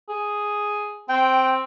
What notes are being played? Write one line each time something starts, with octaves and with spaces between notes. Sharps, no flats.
G#4
C4 G5